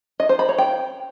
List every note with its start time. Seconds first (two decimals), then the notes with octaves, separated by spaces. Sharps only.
0.20 D#5
0.29 C5
0.39 B5
0.49 C#5
0.58 G5